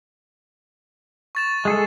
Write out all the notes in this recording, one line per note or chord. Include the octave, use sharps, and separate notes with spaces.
C#6 A6 E7
G#3 G#4 A4